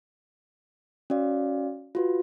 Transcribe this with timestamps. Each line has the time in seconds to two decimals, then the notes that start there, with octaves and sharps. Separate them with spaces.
1.10 C#4 F#4 D5 F5
1.95 F4 F#4 B4